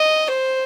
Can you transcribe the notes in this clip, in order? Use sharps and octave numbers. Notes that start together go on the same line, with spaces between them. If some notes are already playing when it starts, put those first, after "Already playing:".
Already playing: D#5
C5